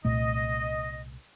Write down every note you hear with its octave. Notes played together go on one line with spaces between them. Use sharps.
C2 A#2 A3 D#5